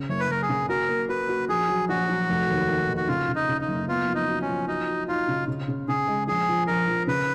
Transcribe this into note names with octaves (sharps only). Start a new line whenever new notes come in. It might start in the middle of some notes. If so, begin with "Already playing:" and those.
Already playing: C#3
F#1 C#5
B4
F#1 A#4
G#4
C#3
F#4 A#4
A#3
F#4 B4
F#4
A#1 G#4
F#3
A#1 F#4
F#3
F1
D#2
D#3
D#2
F#4
C#3 F4
C#3
D#4
C#3
D#4
F#1
B3 F4
F3
D#4
F#4
C#4
F3
D#4 F#4
F#4
D#4 F4
C#3
C#3
C#3
C#3 G#4
G#3
A#1 G#4
F3
A#1 A#4
F3
C#3 B4